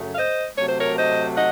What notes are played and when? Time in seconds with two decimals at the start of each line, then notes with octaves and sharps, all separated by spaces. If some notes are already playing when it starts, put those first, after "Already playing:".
Already playing: F#2 C#3 F#3 A3
0.14 F5
0.18 C5 D#5
0.57 C3 F#3 A3 C#5
0.68 C5
0.78 A#4 C#5
0.97 C5 D#5
1.36 D#5 F#5